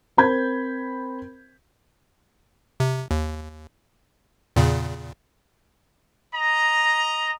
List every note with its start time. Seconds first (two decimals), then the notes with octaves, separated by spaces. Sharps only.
0.17 C4 A#4 C5 B5 G6 G#6
2.80 C3
3.11 D#2
4.56 E2 A#2 C#3
6.34 D#5 A#5